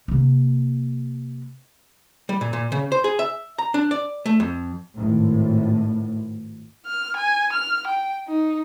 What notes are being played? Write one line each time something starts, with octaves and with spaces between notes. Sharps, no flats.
C3 A#3
G3
A#2
A#2
C#3
C5
G#4
E5
A#5
D4
D5
A3
F2
G#1 A2
F6
G#5
F6
G5
D#4